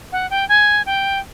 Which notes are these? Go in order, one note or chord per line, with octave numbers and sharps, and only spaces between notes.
F#5
G5
G#5
G5